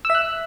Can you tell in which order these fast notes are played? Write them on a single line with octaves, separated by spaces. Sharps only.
E6 E5 F#6